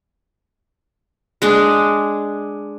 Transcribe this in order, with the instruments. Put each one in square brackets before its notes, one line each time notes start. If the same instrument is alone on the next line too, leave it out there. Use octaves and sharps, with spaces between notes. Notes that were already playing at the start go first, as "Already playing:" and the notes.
[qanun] G#3 D4 G#4